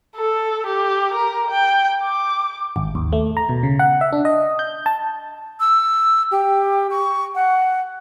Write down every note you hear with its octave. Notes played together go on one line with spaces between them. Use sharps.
A4
G4
A#4
G5
D6
G#1
D#2
A3
A#5
B2
C#3
F#5
E5
D4
D#5
G6
A5
E6
G4
C#6
F#5